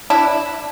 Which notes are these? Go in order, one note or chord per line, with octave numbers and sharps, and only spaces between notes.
D4 E4